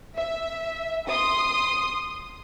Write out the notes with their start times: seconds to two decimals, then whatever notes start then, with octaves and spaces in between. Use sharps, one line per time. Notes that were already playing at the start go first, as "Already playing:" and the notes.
0.16 E5
1.07 C6 D#6